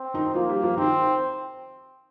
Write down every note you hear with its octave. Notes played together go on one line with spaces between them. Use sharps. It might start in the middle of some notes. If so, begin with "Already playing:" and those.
Already playing: C4
D#3 D#4
D#4
F3 A#3 F4
G3 G4
F3 F4
D#3 C4 D#4